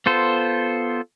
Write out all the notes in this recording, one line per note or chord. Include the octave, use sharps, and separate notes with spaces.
B3 F4 A4 C5